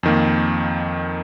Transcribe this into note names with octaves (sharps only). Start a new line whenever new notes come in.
F2 D#3 A#3